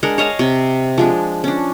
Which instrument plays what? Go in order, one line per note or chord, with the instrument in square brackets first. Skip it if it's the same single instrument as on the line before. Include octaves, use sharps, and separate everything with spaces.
[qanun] G#3 D4 A#4 F#5
C#5 D#5 F5 A5
C3
F3 G#3 D4
C#4 D4